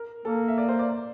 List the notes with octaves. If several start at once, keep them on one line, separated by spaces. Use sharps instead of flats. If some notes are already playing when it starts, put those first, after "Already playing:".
Already playing: A#4
A#3 A4
E5
D5
C5
D5